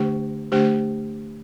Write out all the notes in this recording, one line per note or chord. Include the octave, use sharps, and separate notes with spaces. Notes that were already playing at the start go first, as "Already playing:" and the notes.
Already playing: D3 A3 D4 G4 C5
D3 A3 D4 G4 C5